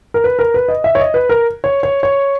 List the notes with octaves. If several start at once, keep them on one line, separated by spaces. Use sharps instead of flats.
A#4
B4
A#4
B4
D#5
E5
C#5
D#5
B4
A#4
C#5
C#5
C#5